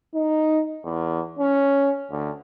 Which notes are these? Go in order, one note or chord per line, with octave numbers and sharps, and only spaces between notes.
D#4
E2
C#4
D2